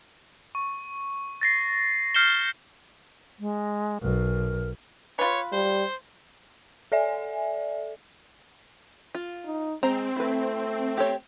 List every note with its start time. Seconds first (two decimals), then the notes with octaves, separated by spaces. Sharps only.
0.55 C#6
1.41 A6 A#6 C7
2.14 F6 G6 C7 C#7 E7 G7
3.39 G#3
4.02 B1 A#4
5.19 F4 B4 C#5
5.52 G3 C5
6.92 A4 D5 E5 G#5
9.15 F4
9.45 D#4
9.83 G#3 C4 C5 A#5
10.16 A3 E4 B4
10.97 G4 A4 C#5